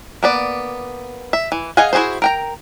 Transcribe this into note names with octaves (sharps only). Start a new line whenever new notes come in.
A#3 B3 D5
E5
E3
G#4 D#5 F5 F#5 G#5
E4 F#4 G#4 A4 C5
A#4 G5 A#5